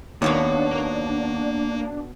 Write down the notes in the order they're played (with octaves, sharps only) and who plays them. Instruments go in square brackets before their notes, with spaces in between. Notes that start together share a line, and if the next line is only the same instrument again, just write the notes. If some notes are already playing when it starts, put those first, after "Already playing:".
[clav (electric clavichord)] D#2 [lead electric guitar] A#3 F5 [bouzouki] B3 F#4 C#5 [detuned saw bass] D4